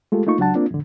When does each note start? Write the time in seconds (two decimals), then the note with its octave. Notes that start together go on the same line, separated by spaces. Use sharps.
0.12 G#3 A3 F4 G4 A4
0.27 A3 A#3 D#4 F4 C#6
0.39 C#2 F#3 D4 F#5 A5
0.55 A#3 C4 D4 F4
0.71 F2 A2 D3